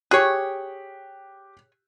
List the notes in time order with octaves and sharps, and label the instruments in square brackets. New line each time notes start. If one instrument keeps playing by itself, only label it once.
[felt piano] G4 F#6 [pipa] G#4 C#5